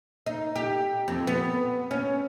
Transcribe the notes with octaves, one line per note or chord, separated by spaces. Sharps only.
D#4
G4
F2
B3
C#4